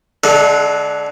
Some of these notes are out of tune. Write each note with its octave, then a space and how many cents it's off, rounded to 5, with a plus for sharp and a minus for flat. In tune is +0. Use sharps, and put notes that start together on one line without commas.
D3 +0 G#3 +25 A4 -35